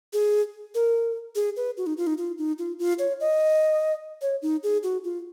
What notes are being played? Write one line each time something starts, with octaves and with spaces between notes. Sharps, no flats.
G#4
A#4
G#4
B4
F#4
D#4
F4
D#4
F4
D#4
F4
F4
C#5
D#5
C#5
D#4
G#4
F#4
F4